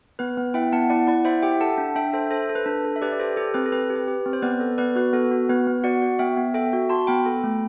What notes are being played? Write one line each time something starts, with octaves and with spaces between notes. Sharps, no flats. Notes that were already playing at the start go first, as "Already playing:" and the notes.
B3 B4
B3
E4 E5 G5
B3 F#5 A5
E4 D5 F#5
E4 D5 F#5
E4 C5 E5
G4 E5 G5
A4 F#5 A5
D4
D4 E5 G5
A4 C5 E5
A4 C5
A4
B4
D4
A4
E5
G4 B4 D5
D5
G4 A4 C5
G4 A4
C4 B4
A4
C4 B4
G4
B4
G4
C4
C5
B3 B4 D5
A4
B3 B4 D5
F#4 B4
B3 A4
F#4
B3 B4
B3
F#4 D5 F#5
F#4
B3 E5 G5
B3
A4 E5 G5
F#4
F#4 A5 C6
B3 G5 B5
A4
A3